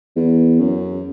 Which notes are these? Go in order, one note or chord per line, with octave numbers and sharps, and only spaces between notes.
E2
F#2